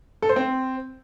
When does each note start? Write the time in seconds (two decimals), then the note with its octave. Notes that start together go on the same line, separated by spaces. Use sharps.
0.22 A4
0.29 C5
0.36 C4